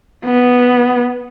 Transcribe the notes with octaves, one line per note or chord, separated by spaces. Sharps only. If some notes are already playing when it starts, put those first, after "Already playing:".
B3